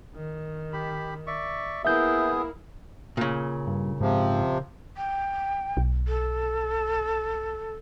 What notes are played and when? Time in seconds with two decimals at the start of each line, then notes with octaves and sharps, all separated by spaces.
0.15 D#3
0.73 G4 B5
1.27 D5 E5 C#6
1.85 A#3 B3 E4 G#4 E5 G6
3.17 A#2 C#3
3.67 G2
4.00 G#2 C3 F3
4.97 G5
5.77 B1
6.08 A4